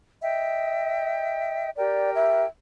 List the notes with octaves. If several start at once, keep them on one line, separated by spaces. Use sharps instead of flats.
D#5 E5 G5
G4 A#4 D5 G5
E5